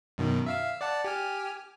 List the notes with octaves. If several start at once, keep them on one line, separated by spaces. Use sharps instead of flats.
F#2 B2 D#3
E5 F5 E6
D5 F#5 A5
G4 G#5 F6